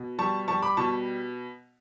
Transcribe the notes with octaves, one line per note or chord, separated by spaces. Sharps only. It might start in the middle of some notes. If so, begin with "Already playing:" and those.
Already playing: B2
G3 A5 C#6
G3 A5 C#6
B5 D6
B2 A5 C#6